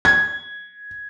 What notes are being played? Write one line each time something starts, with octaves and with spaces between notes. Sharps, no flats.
G#6